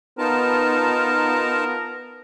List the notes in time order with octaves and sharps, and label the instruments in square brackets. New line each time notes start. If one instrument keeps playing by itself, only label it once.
[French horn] B3 [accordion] D#4 F4 A5 [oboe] A#4